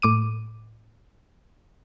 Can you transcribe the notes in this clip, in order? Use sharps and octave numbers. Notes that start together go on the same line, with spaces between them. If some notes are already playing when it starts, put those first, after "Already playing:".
A2 D6 D#7